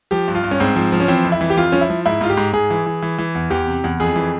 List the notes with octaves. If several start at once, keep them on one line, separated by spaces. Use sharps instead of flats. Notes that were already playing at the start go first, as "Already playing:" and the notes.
F3 G4
G2
F4
G2
C#4
G#2 C4
F3
F3
C#4
E3 C4
F2
E4
E3
G4
F2 F4
F3 C#4
E4
F3
G#2 E4
G#2 F4
G4
G#2
G#2 G#4
E3
E3
E3
E3
E2
E2 G4
C3
E2
F2 G#4
E3